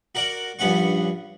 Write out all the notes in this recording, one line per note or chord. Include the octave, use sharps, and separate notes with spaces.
F#4 A#4 D5 F#5
A#1 G2 B3 C#4 F#5 C#6